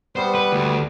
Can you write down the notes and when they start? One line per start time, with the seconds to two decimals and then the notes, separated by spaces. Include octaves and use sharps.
0.16 G3 B3 C5
0.35 B4
0.52 D2